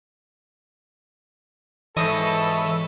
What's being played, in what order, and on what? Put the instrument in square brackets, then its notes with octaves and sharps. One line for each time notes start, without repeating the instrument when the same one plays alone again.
[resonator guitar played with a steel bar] G#2 D#5 [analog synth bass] E3 [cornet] A4 [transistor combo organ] B4 C#5 E5